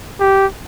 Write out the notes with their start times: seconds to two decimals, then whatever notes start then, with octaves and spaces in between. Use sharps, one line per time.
0.20 G4